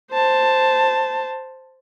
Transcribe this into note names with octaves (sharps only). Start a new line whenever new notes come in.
C5 A5